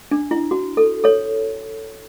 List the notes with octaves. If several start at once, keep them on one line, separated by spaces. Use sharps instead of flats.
D4
E4
F#4
A4
A4 C#5